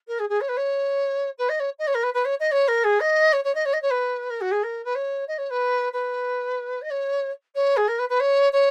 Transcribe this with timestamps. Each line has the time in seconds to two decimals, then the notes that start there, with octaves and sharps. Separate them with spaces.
0.07 A#4
0.19 G#4
0.29 G#4
0.40 C#5
0.48 B4
0.56 C#5
1.38 B4
1.49 D#5
1.59 C#5
1.79 D#5
1.87 C#5
1.94 A#4
2.03 B4
2.13 B4
2.25 C#5
2.40 D#5
2.51 C#5
2.67 A#4
2.84 G#4
3.00 D#5
3.32 C#5
3.44 C#5
3.54 D#5
3.65 C#5
3.73 D#5
3.82 C#5
3.90 B4
4.29 A#4
4.41 F#4
4.51 G#4
4.63 A#4
4.84 B4
4.95 C#5
5.28 D#5
5.38 C#5
5.50 B4
5.92 B4
6.81 D#5
6.90 C#5
7.55 C#5
7.76 G#4
7.87 A#4
7.98 B4
8.09 B4
8.20 C#5
8.52 C#5